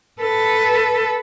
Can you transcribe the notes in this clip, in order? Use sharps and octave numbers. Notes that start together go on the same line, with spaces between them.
A4 B4